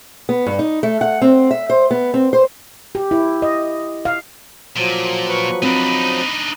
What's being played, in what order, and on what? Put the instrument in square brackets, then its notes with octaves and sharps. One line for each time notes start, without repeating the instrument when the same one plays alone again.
[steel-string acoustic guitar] B3
G2
D#4
A3
F#5
C4
E5
C5
B3
C4
C5
[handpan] G4
E4
D#5
F5
[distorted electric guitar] A#2 [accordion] F3 F#3
[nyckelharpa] B4 C#6
[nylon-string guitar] C4 [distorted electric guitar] D4 D#4 [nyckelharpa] B5